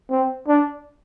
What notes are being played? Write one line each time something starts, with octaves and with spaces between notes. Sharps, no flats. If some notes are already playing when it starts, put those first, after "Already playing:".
C4
D4